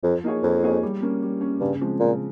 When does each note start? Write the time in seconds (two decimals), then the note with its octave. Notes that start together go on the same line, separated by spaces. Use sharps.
0.03 F2 F3
0.24 A#3 D#4 G#4 C#5
0.43 F2 F3
0.62 A#3 D#4 G#4 C#5
0.83 G3
1.02 A#3 C#4
1.22 G3
1.41 A#3 C#4
1.61 G2 C#3
1.81 F3 G#3 C4
2.00 A#2 C#3